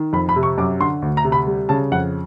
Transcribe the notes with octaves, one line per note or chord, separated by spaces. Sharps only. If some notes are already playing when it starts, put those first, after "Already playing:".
Already playing: D#3
F2 B5
B5
C3
C#6
F#2 D6
D3 C6
D2
A#5
C3
B5
G3
C#3 A5
F2 F#5